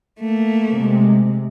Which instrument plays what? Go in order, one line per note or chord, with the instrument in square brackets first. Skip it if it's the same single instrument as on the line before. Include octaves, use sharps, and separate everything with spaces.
[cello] A3 A#3
[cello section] C3 G#3